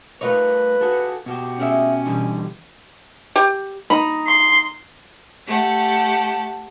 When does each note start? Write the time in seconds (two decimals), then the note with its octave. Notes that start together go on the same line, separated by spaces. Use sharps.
0.21 A3 D#4 F4 A#4 B4 C#5
0.81 F#4 G#4 A4
1.26 B2 F#4 G4
1.58 D2 G#3 C#4 E5
2.06 B2 D3 E3 G3
3.36 G4
3.90 D#4 B5
4.28 C6
5.46 A3 G4 F#5 A5